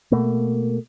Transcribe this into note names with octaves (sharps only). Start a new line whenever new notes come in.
B2 A3 A#3